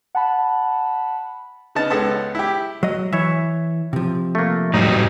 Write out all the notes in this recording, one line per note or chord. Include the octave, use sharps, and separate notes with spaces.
F#5 A5 B5
C#3 B3 D#4 A5
C#2 G#3 B3 A4 A5
E4 G4
F#3 D#5
E3 C#5 E5
C3 F3
A3 A#3
A2 F#3 G3 D#4